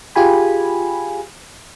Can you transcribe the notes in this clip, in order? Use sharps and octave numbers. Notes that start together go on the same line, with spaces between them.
F4 G4 G#4 G#5 B5